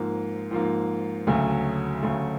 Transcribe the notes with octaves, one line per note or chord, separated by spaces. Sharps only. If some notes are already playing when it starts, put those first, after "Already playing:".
Already playing: G#2 F3 A#3
G#2 F3 A#3
D2 C#3 F#3 A3
D2 C#3 F#3 A3